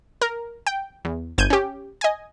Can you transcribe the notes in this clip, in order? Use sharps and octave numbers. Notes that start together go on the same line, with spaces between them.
A#4
G5
E2
G1 G6 G#6 D#7
C#4 G4
D#5 G#5